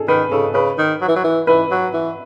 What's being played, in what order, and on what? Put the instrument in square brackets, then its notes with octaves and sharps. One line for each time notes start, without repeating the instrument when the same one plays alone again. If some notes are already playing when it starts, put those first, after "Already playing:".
Already playing: [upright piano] G#4 A4
[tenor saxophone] D#3 [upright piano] B4
[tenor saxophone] C#3 [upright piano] A4
[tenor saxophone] C#3 [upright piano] B4
[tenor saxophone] D#3
F#3
E3
F#3
E3
[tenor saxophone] E3 [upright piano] B4
[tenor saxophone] F#3
E3